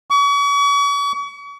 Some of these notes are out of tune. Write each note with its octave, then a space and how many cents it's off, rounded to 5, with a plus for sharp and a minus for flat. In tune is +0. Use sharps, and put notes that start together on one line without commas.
C#6 +40